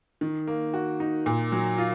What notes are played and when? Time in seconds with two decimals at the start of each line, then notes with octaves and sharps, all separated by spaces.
0.21 D#3
0.47 A#3
0.74 F#4
1.00 D#4
1.26 A#2
1.52 F#3
1.78 F4